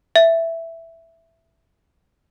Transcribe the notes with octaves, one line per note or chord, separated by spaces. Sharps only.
E5